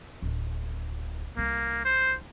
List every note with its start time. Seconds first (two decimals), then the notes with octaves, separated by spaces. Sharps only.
0.22 D1
1.37 C2 D#3 A#3
1.85 C5